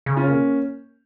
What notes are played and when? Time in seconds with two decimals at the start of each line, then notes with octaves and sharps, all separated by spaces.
0.06 C#3
0.17 C#4 F4
0.27 A#3 C#4